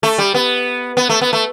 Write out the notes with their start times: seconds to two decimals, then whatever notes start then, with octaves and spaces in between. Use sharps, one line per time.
0.03 A3
0.18 G3
0.34 B3
0.97 B3
1.09 A3
1.21 B3
1.33 A3